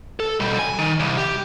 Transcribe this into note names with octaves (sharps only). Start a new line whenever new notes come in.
A4
B2 G3
G#5
D#3
C2
G4